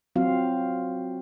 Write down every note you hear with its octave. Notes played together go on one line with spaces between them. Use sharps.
F#3 C4 F4 F#4 F5